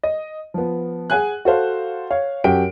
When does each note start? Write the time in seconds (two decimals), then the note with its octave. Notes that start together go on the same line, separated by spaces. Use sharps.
0.03 D#5
0.54 F3 B3
1.10 G#4 F#5 G#5 F#6
1.45 F#4 A4 C5 F5
2.10 C#5 F5
2.44 F#2 F#4 G4 G5 D7